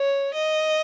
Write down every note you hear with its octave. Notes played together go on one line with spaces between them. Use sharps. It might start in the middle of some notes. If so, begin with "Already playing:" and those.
Already playing: C#5
D#5